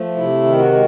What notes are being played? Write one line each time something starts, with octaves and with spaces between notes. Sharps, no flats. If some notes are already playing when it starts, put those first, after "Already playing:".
Already playing: F3 A3
C3 E4
D#3
F#4
G#3